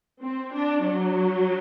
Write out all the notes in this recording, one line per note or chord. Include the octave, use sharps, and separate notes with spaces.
C4
D4
F#3